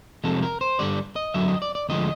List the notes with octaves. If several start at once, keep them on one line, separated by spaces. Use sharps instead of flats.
F2 C3 F3 G#3 A4
A#4
C5
G2 D3 G3 D5
D#5
F#2 D3 F#3 E5
D#5
D5
D5
D2 D3 F3 G#3 D#5